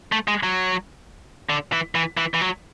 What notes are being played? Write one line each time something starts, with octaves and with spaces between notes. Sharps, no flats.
A3
G#3
F#3
D3
E3
E3
E3
E3
F#3